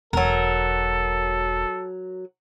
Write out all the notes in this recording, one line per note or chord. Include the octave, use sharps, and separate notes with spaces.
E1 F#3 A4 A#4